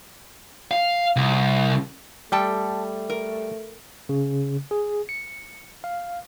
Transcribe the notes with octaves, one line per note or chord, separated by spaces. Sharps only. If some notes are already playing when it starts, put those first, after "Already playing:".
F5
C2
G3 A3 A4 G5 A5
A#4
C#3
G#4
C#7
F5